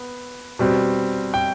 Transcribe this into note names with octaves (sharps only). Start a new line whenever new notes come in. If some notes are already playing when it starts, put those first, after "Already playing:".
Already playing: B3
B2 G3 C4
G5